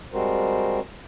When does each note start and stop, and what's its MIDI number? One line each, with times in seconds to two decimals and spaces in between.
0.13 0.80 55
0.13 0.80 56
0.13 0.80 60
0.13 0.80 66
0.13 0.80 70
0.13 0.80 72